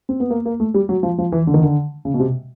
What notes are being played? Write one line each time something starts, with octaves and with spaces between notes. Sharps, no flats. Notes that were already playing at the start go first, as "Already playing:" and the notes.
C4
B3
A#3
A#3
A3
G3
F#3
F3
F3
E3
D3
D#3
D3
C#3
B2
C3